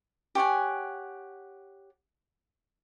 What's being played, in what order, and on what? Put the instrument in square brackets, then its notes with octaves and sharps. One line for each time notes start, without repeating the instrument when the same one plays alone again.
[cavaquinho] G4 C#5 F#5 G#5